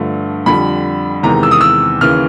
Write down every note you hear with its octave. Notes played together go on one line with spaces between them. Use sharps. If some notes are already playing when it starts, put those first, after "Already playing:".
Already playing: G2 D3 F3 A3
F2 D3 G3 B5
E2 C3 D#3 G#3 A#5
E6
D#6
E6
D#2 C#3 E3 F6